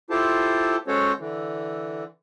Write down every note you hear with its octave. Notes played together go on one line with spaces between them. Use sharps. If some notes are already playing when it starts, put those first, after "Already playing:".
E4 F4 G4 A4 C5 A5
G#3 C#4 F#4 A4 C5 C#5
D3 E3